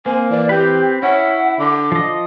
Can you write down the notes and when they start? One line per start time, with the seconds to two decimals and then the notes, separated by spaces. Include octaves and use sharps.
0.06 A#3 C4 G#5
0.30 E3 D5
0.49 C4 G4 B4
1.03 C#4 E4 F#5
1.59 D3 D6
1.92 F3 D#5